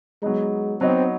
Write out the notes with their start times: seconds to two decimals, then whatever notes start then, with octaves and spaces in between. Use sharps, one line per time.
0.22 F#3 G#3 B3 D#4
0.81 F#3 B3 C4 D#4